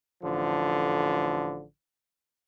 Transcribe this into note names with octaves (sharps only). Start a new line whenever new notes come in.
A1 D3 F3